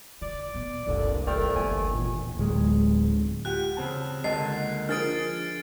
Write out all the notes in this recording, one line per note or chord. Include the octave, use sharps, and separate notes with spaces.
C#3 D5
B2
F#1 C2 A#2 D3
D#2 E3 F3 A3 A#3 A#4 D5 G5
G1 E3 G#5
D#2 A#2
D1 G#3
F4 G4 F#5 F#6
C#3 C4 A5
C#2 D3 A#3 D#5 A5 C7
F3 D4 G#4 A#4 D#6 F6 A6 D7